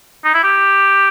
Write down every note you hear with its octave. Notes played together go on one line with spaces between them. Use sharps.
D#4
E4
G4